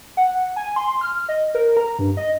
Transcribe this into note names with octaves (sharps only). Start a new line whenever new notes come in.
F#5
G#5
C6
F6
D#5
A#4
A#5
G2
D#5